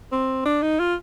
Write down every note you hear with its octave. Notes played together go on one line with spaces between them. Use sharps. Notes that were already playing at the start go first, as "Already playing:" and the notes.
C4
D4
D#4
F4